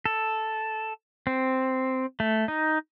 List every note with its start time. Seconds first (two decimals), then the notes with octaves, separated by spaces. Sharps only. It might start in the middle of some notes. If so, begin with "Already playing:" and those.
0.06 A4
1.27 C4
2.20 A3
2.48 D#4